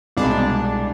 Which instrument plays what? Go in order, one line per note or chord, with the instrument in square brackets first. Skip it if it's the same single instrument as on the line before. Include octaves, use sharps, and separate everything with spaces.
[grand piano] C2 B2 G#3 [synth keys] D4